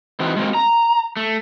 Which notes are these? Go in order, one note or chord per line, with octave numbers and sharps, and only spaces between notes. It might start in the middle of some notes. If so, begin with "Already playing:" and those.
E3 C4 D#4 F#4
G#3 A#3 C4 F#4
A#5
A3